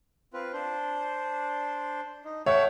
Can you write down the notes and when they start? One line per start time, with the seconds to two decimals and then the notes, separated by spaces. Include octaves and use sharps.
0.34 C4 F4 B4
0.53 D4 C5
2.25 D#4
2.46 A3 C#5 E5 F#5 G5